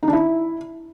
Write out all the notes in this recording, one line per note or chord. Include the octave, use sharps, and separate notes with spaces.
D#4
D4
E4